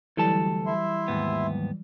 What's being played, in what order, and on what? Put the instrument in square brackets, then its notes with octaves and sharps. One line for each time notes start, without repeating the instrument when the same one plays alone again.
[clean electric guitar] D2 A4 A5 [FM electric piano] E3 F#3 G3
[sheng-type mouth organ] E4 E5 C6
[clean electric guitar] D#2 G#2 B3